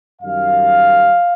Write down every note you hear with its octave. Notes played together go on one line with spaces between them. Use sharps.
F#2 D#3 G3 F5